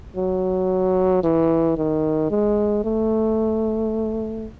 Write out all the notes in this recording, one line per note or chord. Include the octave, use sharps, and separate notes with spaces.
F#3
E3
D#3
G#3
A3